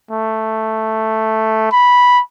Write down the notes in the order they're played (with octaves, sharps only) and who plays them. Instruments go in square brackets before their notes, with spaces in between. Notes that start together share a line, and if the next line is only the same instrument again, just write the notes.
[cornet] A3
B5